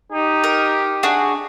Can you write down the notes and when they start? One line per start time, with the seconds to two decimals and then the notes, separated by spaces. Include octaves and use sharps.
0.12 D#4 G4
0.44 A#4
1.03 D4 F#4 G#4